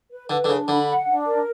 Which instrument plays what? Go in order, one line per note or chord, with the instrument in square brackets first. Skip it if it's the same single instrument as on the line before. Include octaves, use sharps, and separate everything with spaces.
[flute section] B4
[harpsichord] D3 [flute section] B4
[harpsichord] D3
[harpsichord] C#3 [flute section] D4
[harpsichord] D3 [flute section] B5
[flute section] F#5
D4
A#4